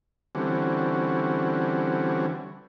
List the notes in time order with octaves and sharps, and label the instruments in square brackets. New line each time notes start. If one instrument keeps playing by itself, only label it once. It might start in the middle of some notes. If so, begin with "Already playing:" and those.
[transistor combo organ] D3 E3 G3 C4 C#4 F#4